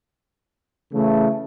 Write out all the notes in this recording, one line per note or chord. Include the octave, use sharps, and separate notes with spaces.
C#3 E3 A3